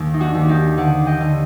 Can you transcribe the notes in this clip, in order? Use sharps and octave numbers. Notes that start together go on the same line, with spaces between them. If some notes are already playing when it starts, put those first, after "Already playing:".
Already playing: D#2
D#4
D4 F#4
D#2
D#4 G4
D3 D5 F#5
D#5 G5
D3